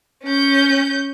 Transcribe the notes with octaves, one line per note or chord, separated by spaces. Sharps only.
C#4 G6